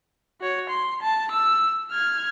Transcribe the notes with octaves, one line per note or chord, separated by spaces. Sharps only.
F#4 C#5
C6
A5
E6
F6 G#6